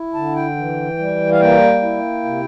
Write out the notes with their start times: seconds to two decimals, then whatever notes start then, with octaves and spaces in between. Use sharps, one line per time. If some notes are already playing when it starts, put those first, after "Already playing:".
Already playing: E4
0.14 D3 A5
0.35 G5
0.57 E3
0.99 G3
1.31 F5
1.40 A#3 G5
1.82 E4
2.25 C3